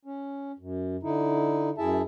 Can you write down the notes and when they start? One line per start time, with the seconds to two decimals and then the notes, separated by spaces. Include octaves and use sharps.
0.05 C#4
0.59 F#2
1.03 D3 D#4 E4
1.78 F#2 E4 G#4 E5 A5